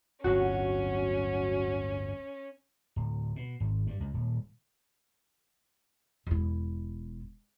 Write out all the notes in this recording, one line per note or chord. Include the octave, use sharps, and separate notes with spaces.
D1 G1 F#3 C#4 F#4
D1
B2
G#1
G2
C#2
D#1
E1 E4